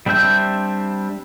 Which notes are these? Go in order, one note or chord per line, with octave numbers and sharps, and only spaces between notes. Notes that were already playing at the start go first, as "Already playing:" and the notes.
G3 C4 D4 E5 G6